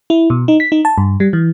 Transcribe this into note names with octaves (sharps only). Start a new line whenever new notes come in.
E4
B2
D#4
B6
D#4
A5
G2
G3
E3